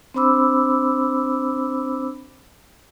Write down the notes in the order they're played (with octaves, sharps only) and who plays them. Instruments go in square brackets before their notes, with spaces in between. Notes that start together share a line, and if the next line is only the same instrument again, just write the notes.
[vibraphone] C4 D4 C5 B5 D6 E6